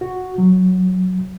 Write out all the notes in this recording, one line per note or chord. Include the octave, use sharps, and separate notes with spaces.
F#4
F#3